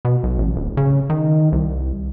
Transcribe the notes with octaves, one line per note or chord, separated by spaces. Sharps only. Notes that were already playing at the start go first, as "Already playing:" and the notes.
B2
B1
A1
D1
C#3
D#3
C2